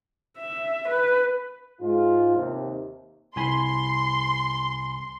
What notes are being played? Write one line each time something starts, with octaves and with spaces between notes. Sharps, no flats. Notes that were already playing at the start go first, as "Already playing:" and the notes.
E5
B4
G#2 F4
D#2 C3
C2 G#5 B5 C6